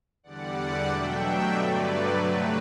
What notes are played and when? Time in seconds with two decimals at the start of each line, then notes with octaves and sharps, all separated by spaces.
0.23 E2 D3 G3 D5 F#5
0.87 B2 F#3 A3 D4 E5 G5
1.50 G2 D3 F#3 A3 B4 D5
2.13 C3 F#3 A3 B4